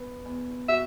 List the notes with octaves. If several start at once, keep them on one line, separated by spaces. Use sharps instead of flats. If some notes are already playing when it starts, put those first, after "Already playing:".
Already playing: B3
E2
F#4 E5